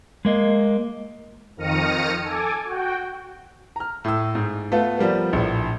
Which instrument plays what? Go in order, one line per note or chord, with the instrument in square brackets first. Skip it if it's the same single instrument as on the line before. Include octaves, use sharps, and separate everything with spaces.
[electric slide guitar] G#3 A#3 D#5
[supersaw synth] F2 D#3 F6 A#6 C#7 D#7
A4 G#5 D6
F#4 G5
[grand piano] A#5 F6
A2 E6
G#2
A3 B3 F4
F3 G3 A#3 B3
A#1 A2